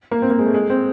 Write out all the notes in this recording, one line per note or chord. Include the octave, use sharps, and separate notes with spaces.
A#3
C4
A#3
G#3
A3
G#3
C4